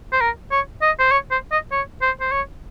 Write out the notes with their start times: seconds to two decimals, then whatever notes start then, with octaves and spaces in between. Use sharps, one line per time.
0.12 C5
0.20 A#4
0.51 C#5
0.82 D#5
0.99 C5
1.11 C#5
1.31 C5
1.52 D#5
1.72 C#5
2.02 C5
2.20 C5
2.32 C#5